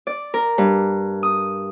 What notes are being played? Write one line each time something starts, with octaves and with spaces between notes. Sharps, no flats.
D5
A#4
G2
D#6